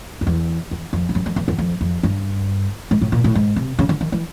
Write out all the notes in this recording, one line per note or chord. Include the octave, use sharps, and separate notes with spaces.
F2
E2
E2
F2
G2
F#2
F2
E2
E2
F2
F2
G2
G#2
A2
A#2
A2
G#2
C3
C#3
D3
D#3
E3